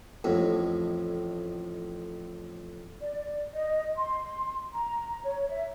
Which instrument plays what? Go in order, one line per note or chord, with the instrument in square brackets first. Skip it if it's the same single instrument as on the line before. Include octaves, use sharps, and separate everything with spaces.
[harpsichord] A1 F2 A2
[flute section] D5
D#5
C6
A#5
C#5
E5